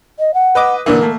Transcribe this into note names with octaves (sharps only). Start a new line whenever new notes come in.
D#5
F#5
B4 D#5 D6
A#2 D3 E3 A#4
A3 A#3